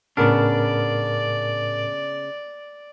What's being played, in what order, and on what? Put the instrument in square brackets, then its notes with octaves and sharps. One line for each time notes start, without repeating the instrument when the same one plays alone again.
[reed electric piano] A2 A#4 F6 [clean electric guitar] C#3 B3 D4 [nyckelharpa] D5